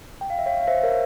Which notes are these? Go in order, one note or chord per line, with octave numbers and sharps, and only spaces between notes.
G5
F5
E5
C#5 F5
F5
C5 E5
A#4 C#5